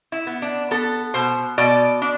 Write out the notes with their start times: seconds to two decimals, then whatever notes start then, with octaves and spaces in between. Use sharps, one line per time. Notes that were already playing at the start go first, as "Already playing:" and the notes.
0.12 E4
0.27 B3
0.42 D4
0.71 B3 A4
1.14 B2 C5
1.58 B2 D5
2.02 D4